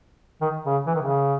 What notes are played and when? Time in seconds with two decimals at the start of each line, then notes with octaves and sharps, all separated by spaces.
0.41 D#3
0.66 C#3
0.87 E3
0.94 D#3
1.02 C#3